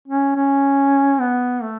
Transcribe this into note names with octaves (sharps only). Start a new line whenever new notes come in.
C#4
C#4
B3
A3